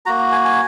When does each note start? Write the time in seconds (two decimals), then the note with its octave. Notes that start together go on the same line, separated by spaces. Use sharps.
0.06 A#3 F#4 A#5
0.32 G#5
0.45 G#5